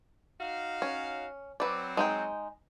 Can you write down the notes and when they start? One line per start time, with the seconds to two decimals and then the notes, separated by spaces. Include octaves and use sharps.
0.39 D#4 F#4 F5
0.82 C#4
1.60 F#3 C4 B4 D5
1.97 G#3 D#4 G5